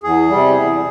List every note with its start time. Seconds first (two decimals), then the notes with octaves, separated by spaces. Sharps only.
0.03 E2 G#4
0.29 C3 G3
0.55 E2